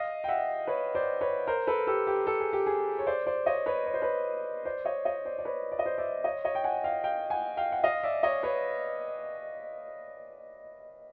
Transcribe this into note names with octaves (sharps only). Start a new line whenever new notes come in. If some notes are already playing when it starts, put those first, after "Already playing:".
Already playing: D#5 F5
G5
E5 F#5
B4 C#5
C5 D5
B4 C#5
A#4 C5
A4 B4
G4 A4
G4
A4
G#4
G4
G#4
C#5
C5 D5
C5 D5
C#5 D#5
B4 C#5
C#5
C5
B4 C#5
C5 D5
C#5 D#5
C#5 D#5
C5 D5
D5
B4 C#5
D5
D#5
C5 D5
D5 E5
C#5 D#5
C#5 D#5
G5
F#5 G#5
F5 G5
F5 G5
F#5 G#5
F5 G5
F#5
D#5 F5
D5 E5
C#5 D#5
B4 C#5